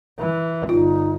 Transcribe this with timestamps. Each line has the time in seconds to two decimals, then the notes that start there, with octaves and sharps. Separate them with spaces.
0.19 E3
0.69 G1 D#4 F4